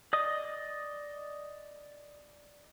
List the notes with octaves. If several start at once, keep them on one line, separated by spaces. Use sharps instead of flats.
D5 D#5 D#6